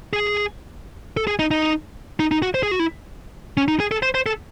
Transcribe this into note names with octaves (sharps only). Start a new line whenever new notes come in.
G#4
A4
G#4
D#4
D#4
D#4
D#4
F#4
C5
G#4
F#4
E4
C#4
D#4
G#4
A4
C5
C5
A4